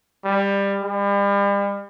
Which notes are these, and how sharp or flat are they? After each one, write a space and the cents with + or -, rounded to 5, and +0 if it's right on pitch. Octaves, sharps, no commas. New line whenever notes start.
G3 +20
G3 +40